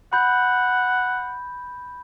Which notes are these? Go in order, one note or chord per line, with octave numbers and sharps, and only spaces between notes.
F#5 B5 G6